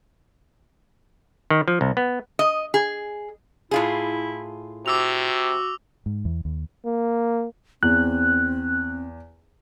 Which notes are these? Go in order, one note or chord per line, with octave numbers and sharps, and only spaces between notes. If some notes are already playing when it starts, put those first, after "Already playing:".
D#3
F3
C2
B3
D#5
G#4
A2 E4 F4 G#4
C3 F#4 D6 E6 F7
G#2
E2
D#2
A#3
E2 C4 F#6